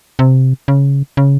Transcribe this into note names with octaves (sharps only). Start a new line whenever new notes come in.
C3
C#3
C#3